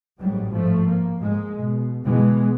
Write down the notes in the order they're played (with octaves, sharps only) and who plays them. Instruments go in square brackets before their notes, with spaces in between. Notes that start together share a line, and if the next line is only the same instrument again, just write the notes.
[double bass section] A1 G#2 F#3 G3
G#2 F3 A3
A#3
G#2 G#3
B2
B2 E3 G#3 B3